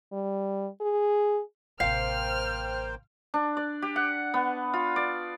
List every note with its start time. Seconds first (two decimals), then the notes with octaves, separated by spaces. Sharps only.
0.13 G3
0.81 G#4
1.80 A1 C3 A#3 C5 F5 G5 F6
3.34 D4
3.57 D5
3.82 G4
3.96 F#5
4.34 B3
4.74 F4
4.96 D5